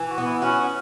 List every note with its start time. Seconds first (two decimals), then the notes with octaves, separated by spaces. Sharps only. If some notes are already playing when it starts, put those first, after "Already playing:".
Already playing: E3
0.10 F#4
0.18 B3
0.26 E4
0.42 C#4 F#4
0.63 C#4